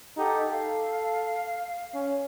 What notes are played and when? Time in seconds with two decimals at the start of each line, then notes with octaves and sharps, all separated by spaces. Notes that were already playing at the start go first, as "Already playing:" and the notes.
0.17 D#4 G4 A4 F#5
0.50 A4 F5
1.94 C#4